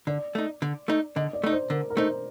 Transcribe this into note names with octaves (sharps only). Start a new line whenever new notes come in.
D3 D5
A3 D#4
D3
A3 D#4
D3 D#5
D5
A3 D#4
C5
D3 A#4
A#4
A3 D#4 C5